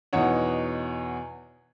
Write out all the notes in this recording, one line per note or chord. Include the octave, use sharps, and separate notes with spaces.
E2 B2 D#4 C#5 F#5